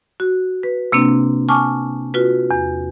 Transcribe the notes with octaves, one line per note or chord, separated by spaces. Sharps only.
F#4
B4
C3 A#3 C4 D4
G#5 A5 C#6 D6 F6
F4 F#4 B4
E2